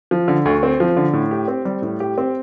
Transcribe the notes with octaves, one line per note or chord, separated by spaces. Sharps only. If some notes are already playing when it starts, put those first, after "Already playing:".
F3
D3
D2
C4
F3
D3
A2
G4
C4
G3
A2
G4
C4